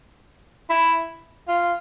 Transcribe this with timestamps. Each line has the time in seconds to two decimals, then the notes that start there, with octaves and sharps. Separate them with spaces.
0.70 E4
1.48 F4